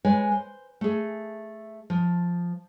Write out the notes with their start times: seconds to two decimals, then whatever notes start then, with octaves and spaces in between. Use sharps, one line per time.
0.05 G#3 B4 C#5 G#5
0.32 C5
0.81 A3 G#4
1.90 F3